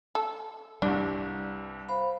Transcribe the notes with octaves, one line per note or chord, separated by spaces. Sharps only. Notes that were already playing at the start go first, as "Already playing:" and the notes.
A4
C2 G2 G3 D4
C5 F5 B5